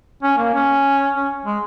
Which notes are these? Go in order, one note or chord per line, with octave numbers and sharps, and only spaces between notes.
C#4
A#3
C#4
C#4
G#3